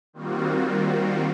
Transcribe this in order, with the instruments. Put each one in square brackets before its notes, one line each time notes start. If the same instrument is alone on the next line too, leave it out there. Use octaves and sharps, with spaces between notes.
[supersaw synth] D#3 G3 A#3 C4 F4 F#4